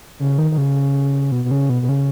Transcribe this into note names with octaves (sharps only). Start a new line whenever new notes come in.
C#3
D#3
D#3
C#3
B2
B2
C#3
B2
B2
C#3